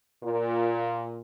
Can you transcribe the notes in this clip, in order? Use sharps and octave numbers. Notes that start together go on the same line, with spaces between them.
A#2